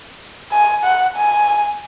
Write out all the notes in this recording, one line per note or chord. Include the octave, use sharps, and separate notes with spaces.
G#5
F#5
G#5